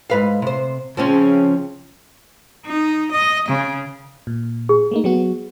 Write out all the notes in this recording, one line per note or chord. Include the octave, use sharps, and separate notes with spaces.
G#2 B4 F5
C3 C5
C#3 F3 C4 C#4
D#4
D#5
C#3
A#2
G#4
A3 A#3 D#4
F#3 B3 F#4